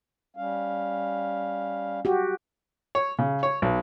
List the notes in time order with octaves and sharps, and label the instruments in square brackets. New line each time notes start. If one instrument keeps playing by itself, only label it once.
[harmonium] G3 C#4 F5
[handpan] F#4 G4
[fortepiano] C#5
C#3
C#5
B1